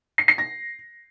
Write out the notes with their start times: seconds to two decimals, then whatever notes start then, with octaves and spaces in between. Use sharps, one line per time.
0.18 C7
0.28 C7
0.38 A#6